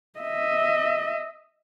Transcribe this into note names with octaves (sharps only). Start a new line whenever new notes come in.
D#5 E5